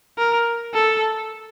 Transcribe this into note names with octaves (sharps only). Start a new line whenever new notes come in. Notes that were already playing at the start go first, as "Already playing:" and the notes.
A#4
A4